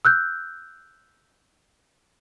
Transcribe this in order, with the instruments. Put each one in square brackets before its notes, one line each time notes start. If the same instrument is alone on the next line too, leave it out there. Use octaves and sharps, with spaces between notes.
[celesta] E6 F#6 G6